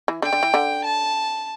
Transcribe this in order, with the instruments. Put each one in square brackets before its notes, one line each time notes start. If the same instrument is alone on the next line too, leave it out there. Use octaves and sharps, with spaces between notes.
[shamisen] E3
[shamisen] D3 [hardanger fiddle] G5
[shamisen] D3
E3
D3
[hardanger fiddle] A5